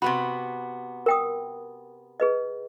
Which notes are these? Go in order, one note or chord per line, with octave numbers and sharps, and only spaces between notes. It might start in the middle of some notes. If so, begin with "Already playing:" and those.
C3 B3 F#4 B5
A#4 G5 D#6
G#4 B4 D#5